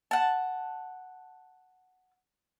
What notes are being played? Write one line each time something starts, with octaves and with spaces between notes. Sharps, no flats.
F#5 A5